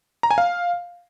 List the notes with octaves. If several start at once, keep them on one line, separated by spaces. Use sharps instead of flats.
A#5
G#5
F5